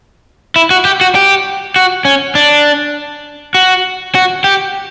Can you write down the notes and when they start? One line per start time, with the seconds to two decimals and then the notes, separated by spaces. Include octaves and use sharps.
0.56 E4
0.70 F#4
0.85 G4
1.01 F#4
1.15 G4
1.76 F#4
2.05 C#4
2.35 D4
3.55 F#4
4.15 F#4
4.44 G4